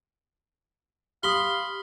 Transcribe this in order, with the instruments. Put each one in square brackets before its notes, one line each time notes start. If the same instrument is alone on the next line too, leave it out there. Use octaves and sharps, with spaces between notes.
[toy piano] G4 D#6 [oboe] F5 [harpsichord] B5 C6